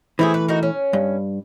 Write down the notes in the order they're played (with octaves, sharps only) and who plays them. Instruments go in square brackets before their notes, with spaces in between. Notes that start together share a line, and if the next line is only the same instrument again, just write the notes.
[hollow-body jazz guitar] E3 A3 [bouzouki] C4 E4 G#4
[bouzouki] B4
D#4 F#4 A#4
C#4
[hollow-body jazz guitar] G2